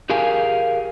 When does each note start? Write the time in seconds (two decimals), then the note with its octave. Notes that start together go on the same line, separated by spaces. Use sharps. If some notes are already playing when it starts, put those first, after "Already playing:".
0.10 G4 G#4 A#4 F5 G#5